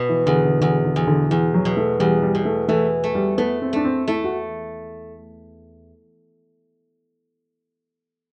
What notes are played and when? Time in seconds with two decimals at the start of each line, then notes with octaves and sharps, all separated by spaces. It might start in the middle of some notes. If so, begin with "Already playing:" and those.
Already playing: B2
0.09 E3
0.26 E2 D3
0.45 D3
0.61 E2 D3
0.84 D3
0.96 E2
1.07 D3
1.30 E2 E3
1.54 F#3
1.65 B2
1.77 A3
1.99 E2 G3
2.23 G3
2.35 B2
2.45 A3
2.68 E3 A3
3.04 A3
3.15 G3
3.38 A3 B3
3.62 C4
3.73 A3 D4
3.85 C4
4.08 A3 E4
4.24 F#4